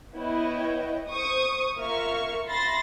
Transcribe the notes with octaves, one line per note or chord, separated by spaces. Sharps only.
B3 E4 B4 C#5 D#5 G5
C5 C#6 D#6
A#3 F4 A#4 E5 C#6 F6
E5 B5 C6 A6 A#6